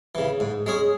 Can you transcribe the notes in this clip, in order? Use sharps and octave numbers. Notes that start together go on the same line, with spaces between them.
C#3 E3
G#2
G#3 C#4 G#4